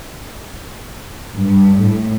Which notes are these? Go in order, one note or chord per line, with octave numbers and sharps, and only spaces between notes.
G2
A2